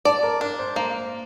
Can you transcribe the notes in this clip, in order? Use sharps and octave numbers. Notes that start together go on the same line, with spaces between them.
D5 A5
A#4
D4 A#4
C5
A#3 C5